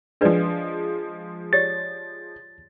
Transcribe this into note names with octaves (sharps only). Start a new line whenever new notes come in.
F3 G#3 D4 B4 D5
G4 C#5 D5 A6